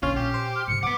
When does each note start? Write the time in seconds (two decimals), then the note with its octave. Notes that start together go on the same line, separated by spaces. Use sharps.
0.03 A#1 D#3 C#4 D4 F4 F5
0.16 A#2 G4
0.34 C5
0.56 F6
0.68 G#2 C3 C#7
0.83 F3 B4 F#5 D6